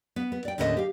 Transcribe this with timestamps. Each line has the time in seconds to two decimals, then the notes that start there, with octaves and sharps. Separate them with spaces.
0.16 B3
0.32 B3
0.45 D5 G5
0.58 D#2 A2 D3 C#4 B4 D#5
0.77 G4 F5